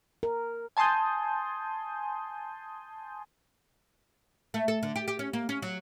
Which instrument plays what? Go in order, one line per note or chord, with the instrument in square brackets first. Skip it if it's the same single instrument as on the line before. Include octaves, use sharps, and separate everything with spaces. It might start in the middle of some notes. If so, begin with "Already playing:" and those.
[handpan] A#4
[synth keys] G#5 A5 C6 D#6 G6
[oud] A3
A4
D3
G4
G4
C#4
A#3
C#4
F#3